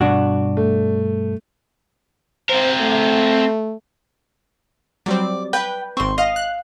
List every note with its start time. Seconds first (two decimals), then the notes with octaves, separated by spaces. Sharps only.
0.01 G2 B2 D4 F#4
0.57 A3
2.49 C4 A#4 C5
2.81 A3
5.06 F#3 G3 C4 D5
5.53 B4 G5
5.97 G#1 C4 C6 C#6
6.18 D#5 F5
6.36 F#6